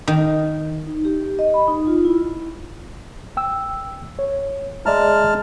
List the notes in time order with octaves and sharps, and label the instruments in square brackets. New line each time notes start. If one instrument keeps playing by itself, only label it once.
[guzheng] D#3
[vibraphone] D#4
G4
D#5
B5
D#4
F4
E4
[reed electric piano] G5 E6
C#5
[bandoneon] G#3 A5 F6 [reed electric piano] D5 E5 A#5